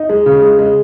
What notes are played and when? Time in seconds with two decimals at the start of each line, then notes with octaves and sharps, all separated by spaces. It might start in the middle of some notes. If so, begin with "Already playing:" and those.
Already playing: D#4
0.09 G#3
0.26 C#3
0.42 G#3
0.59 G#3